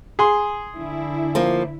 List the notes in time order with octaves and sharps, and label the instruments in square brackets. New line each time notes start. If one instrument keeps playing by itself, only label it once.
[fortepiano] G#4 C6
[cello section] D3 E4
[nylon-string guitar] F3 A#3